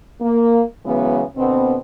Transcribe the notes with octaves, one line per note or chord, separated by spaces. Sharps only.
A#3
C#3 E3 F#3 G#3 B3
B2 D3 B3 C4